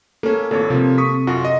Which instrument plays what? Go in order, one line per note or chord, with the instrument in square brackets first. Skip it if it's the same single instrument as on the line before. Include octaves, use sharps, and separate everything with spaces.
[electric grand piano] A#3 C#4 [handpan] A4
[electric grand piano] G#1 A#2 C#5 [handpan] A4
[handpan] C3 [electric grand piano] F3 A#3
[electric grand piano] C#6 D#6 B6
F#2 F4 F#4
D#5 E5